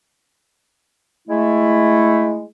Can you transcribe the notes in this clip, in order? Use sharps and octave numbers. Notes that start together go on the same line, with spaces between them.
G#3 A3 E4